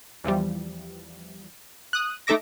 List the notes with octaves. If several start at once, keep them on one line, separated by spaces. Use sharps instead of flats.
E2 E3 F3 G3
D#6 F#6
A3 D#4 A4 E5 D6 A#6